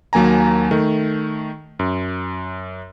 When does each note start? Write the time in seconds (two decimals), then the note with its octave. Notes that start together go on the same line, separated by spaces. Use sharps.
0.13 D#2 F#3 A#3 G#5 A#5
0.71 D#3 A3
1.79 F#2